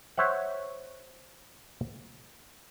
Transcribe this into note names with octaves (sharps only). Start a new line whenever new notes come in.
C5 C#5 E5 F#5